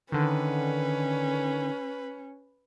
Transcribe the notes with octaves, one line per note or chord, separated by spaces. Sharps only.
D3 D#3 C#4 B4